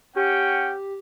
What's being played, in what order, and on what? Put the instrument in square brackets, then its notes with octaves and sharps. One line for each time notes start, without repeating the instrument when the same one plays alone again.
[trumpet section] C#4 F#5 G5 [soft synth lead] G4